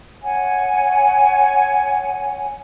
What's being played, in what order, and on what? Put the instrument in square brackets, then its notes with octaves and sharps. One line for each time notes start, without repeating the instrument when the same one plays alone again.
[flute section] C#5 F#5 G#5